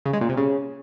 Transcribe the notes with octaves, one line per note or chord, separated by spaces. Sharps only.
C#3
G#3
A#2
C3
C#3